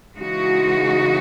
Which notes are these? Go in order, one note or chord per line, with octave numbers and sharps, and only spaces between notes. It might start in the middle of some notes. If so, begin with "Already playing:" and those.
C#3 E3 G#3 D#4 F#4